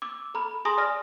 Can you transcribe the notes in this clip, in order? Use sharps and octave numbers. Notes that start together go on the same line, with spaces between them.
D6 E6
A4 A#5 B5
G#4 G#5 A#5 C6 D#6 A#6
D5 G#5 F6 A#6